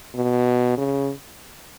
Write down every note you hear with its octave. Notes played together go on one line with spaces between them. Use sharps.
B2
C#3